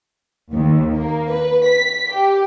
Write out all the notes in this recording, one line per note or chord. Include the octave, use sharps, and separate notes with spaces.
D#2
A#3
B4
B6
G4